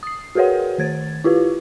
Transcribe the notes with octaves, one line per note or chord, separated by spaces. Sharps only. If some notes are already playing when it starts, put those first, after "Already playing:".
D#6 C7
F#4 G#4 A#4 B4 C#5 F#5
D#3 G#6 A6
E4 F4 G4 B4